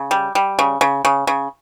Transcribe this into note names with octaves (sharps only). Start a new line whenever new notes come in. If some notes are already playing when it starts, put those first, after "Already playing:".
Already playing: C#3
G3
G3
C#3
C#3
C#3
C#3